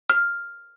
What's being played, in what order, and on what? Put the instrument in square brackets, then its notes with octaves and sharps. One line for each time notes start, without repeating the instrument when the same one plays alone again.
[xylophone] F6